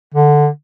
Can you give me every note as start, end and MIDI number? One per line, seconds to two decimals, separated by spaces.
0.14 0.47 50